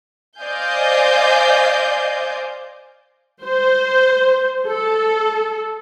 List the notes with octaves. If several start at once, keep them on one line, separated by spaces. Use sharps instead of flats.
C5 D5 D#5 F5 G#5 G6
C5
A4